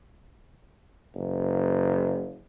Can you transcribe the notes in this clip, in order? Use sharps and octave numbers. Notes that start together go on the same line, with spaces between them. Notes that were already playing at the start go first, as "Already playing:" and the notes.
F#1